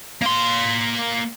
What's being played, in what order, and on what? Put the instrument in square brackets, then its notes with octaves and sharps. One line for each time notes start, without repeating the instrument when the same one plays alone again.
[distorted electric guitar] A#3 C6